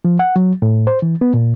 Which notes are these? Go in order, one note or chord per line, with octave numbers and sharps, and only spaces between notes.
F3
F#5
F#3
A2
C5
E3
B3
A#2